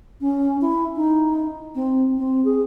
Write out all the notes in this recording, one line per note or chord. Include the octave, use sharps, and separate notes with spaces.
C#4
E4
D#4
C4
C4
G#4